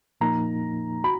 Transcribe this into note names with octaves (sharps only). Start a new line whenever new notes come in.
A#2 F3 A#3 D#4 A#5
F#4 B5